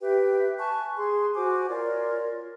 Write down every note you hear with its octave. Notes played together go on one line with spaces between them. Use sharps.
G4 B4 E5 G5
G#5 A5 C#6 F#6
G#4 C6
F#4 C5 G#5 D6
F4 A#4 C#5 D5